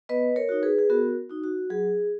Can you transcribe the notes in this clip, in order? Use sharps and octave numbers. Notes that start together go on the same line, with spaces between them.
B3 B4 D#5
A#4 C#5
D#4 F#4
G#4 B4
G#4
B3 F#4 A#4
D#4 F#4
F#4
F#3 G#4